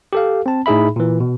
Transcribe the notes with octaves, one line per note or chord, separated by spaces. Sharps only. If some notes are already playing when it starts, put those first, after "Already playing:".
G4 A4 F5
C4 A5
A2 D#4 G#4 E5 B5
A#2 E3
B2